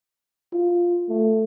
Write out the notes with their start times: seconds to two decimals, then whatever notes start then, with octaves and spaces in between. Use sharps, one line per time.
0.53 F4
1.09 A3